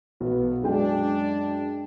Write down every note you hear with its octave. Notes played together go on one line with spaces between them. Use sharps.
B1 B3
F#2 G#3 D4 G5